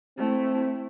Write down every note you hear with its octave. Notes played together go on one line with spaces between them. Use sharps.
A3 C4 E4